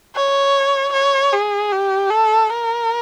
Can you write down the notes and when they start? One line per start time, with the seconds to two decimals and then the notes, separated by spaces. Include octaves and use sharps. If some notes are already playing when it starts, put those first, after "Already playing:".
0.15 C#5
0.93 C#5
1.33 G#4
1.71 G4
2.10 A4
2.49 A#4